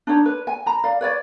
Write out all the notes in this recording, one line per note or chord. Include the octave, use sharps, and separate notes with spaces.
D4 D#4 C#5
B4 C#5
G#5
A#5 B5
D5 F5
B4 C#5 D5